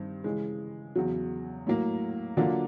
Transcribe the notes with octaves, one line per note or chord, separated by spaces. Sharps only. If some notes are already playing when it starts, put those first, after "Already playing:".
Already playing: G2 D#3 C4
C#3 E3 G#3
E2 C#3 F#3
A2 F#3 A#3
D3 F#3 A#3 D4 F4